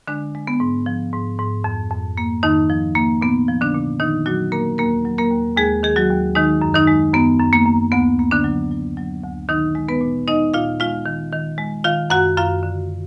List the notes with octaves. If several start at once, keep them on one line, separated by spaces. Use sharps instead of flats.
D3 G#3 D4
G#3
B3
G#2
F3
G#2
G#2
F2
F2
A#3
F2 D#3 D#4
F3
A#3
A#2 B3
F3
D3 D4
A#2
A#2 D#3 D#4
A#2 F#3 F#4
A#2 A#3 A#4
D#2 A#3 A#4
F#3
A#3 A#4
D#2
D#2 G#3 G#4
D#3 G#4
F#3 F#4
D#2
D#3 G#3 D#4
F#2
D#3 D#4
G#3
F#2 B3
F#2
A#3
F#2
D2 B3
A#3
D3 D4
F#3
F#3
F#3
D2
A#2 D#3 D#4
G#3
B3 B4
A#2
G#3 D#4 D#5
A#2 F4 F5
G#3 F4 F5
D#3
D#3
G#3
D#3 F4 F5
F#2 F#4 F#5
F#2 F4 F5
D3